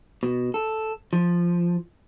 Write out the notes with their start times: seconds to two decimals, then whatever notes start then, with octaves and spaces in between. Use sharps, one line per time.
0.23 B2
0.54 A4
1.13 F3